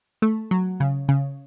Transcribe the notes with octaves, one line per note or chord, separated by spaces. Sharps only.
A3
F#3
C#3
C#3